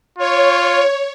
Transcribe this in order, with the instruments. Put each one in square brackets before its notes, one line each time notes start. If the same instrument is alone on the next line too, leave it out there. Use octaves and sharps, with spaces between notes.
[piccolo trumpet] F4 [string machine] C#5